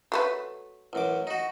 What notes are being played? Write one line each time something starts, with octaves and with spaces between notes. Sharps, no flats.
F#3 A3 B4
A1 F#2 D6
D#4 F#4